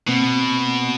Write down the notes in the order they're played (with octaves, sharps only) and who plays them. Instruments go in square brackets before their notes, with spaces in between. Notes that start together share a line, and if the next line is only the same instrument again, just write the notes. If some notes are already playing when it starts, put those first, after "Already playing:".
[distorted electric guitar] B2 [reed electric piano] A#3 C4